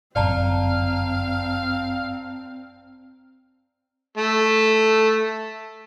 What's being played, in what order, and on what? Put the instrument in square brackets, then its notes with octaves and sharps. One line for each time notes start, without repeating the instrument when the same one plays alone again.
[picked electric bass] G1 F#2 [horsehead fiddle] C4 [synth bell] D5 A5 A#5 [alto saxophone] F5
[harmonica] A3 A4